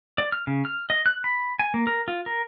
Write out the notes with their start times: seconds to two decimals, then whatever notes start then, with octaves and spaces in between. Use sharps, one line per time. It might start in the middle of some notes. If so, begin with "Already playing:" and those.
0.18 D5
0.32 F6
0.47 C#3
0.65 F6
0.90 D#5
1.06 F#6
1.24 B5
1.59 G#5
1.74 A#3
1.87 A#4
2.08 F4
2.26 A#4